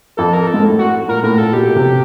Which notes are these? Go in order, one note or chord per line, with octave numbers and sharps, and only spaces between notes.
F2 A4
A#4
A4
G#2
A2
F#4
A#2 A#4
A2 A#4
A#2 A4
B2 G4
C3